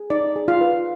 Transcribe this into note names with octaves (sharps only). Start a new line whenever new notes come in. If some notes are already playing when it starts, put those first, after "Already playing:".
Already playing: G#4
D#4 D5
G#4
F4 F5
B4